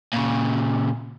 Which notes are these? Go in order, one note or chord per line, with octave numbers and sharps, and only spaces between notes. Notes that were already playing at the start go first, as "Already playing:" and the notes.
A#2 C#3